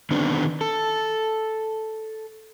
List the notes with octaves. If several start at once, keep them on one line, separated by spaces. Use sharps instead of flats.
D3 D#3 B3 C4 D4
A4